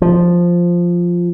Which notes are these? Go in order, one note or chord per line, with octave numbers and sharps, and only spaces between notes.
F3